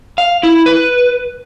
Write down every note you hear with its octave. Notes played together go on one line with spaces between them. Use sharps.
F5
E4
B4